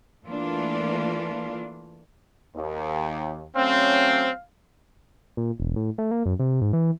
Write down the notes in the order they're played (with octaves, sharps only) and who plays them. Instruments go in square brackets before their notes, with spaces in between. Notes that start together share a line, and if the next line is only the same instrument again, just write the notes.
[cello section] E3 A3 A#3 D4 F4
[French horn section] D#2
[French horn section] F#3 A3 C#4 [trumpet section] C4 [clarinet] F5
[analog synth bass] A#2
E1
A2
A3
A#3
F#2
C3
G#2
E3